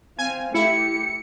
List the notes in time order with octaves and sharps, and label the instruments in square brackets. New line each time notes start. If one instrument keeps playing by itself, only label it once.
[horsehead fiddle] C4 F5 [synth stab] G#5
[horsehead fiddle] A3 G4 [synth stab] E4 [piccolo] C#7